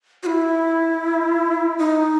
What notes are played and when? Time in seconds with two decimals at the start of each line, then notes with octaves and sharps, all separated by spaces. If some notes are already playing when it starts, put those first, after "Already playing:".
0.23 F#4
0.26 E4
1.79 D#4